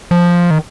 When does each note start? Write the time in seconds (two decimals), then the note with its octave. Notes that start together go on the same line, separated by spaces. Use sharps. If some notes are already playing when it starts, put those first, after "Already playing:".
0.11 F3
0.51 D#3